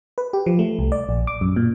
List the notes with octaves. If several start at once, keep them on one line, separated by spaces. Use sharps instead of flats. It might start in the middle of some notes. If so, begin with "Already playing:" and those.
B4
G4
F3
A3
C2
D5
A#1
D6
F#2
A#2